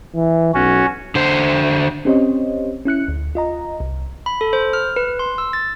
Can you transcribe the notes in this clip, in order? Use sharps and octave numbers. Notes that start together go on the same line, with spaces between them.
E3
B1 C#4 F#4
D3 C5
C4 C#4 G4 C5 C#5 D#5
C#4 E4 F#6 C#7
D2
F4 D#5 A#5
C2
B5
A4
C5
F6
B4
C6
E6
A6